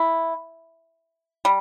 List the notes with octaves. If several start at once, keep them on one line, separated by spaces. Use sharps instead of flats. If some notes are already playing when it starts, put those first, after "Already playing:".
Already playing: E4
G3